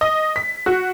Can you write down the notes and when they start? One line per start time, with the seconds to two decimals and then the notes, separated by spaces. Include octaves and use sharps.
0.01 D#5
0.36 B6
0.66 F#4